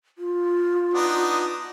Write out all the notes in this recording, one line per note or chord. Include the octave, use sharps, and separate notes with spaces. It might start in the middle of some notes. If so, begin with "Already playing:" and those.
F4
B3 D4 D#4